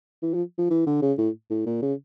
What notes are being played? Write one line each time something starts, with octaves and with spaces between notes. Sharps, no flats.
E3
F3
F3
E3
D3
C#3
A2
A2
A#2
C#3